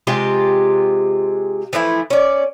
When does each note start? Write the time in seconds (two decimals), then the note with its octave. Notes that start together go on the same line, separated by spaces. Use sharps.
0.07 C3 G#3 F4 G4
1.73 E3 F3 A3 E4
2.10 C#4 D5